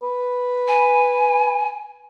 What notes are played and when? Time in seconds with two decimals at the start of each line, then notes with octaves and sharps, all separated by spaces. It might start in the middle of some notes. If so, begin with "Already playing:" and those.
0.03 B4
0.68 G#5